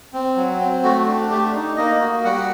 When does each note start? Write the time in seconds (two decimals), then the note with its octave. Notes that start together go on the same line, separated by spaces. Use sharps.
0.13 C4
0.36 F#3
0.60 C4
0.83 A3 F#4
1.07 D4
1.30 A3 G4
1.54 D#4
1.77 A#3 D#4 D#5
2.01 F#4
2.24 G3 F#4 F#5